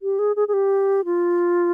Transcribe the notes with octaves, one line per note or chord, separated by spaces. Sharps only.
G4
G#4
G#4
G#4
G4
F4